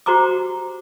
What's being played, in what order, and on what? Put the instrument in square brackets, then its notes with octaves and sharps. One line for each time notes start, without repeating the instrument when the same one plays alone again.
[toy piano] F#4 G4 C5 A#5 C#6 D6